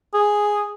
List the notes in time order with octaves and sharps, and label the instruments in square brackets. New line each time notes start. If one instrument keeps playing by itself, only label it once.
[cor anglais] G#4